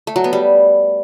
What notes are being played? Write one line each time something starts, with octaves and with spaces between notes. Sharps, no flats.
A3
F#3
B3
G3